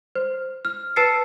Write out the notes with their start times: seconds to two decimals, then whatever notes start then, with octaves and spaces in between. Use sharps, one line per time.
0.15 C5
0.65 F6
0.96 B4 A5 E6 A6 C7 C#7